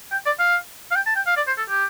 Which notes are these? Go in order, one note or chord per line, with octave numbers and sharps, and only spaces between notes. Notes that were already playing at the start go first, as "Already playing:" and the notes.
G5
D5
F5
F5
G5
A5
G5
F5
D5
C5
A4
G4